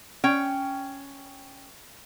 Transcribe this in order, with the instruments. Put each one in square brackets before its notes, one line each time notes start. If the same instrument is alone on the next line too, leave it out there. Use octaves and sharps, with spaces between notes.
[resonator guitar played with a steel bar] C#4 G5